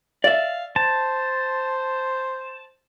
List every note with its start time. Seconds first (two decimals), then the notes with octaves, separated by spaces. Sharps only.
0.24 D5 E5 F5
0.76 C5 A5